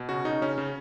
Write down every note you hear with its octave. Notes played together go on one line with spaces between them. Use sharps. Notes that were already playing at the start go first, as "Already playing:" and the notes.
Already playing: B2
C#3 F#4
C#3 D#4
C#3 C#4
C#3